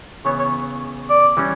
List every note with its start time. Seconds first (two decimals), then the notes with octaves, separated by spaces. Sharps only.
0.25 C#3 E3 B3 C#5
0.38 C#5
1.10 D5
1.37 E3 G3 C#4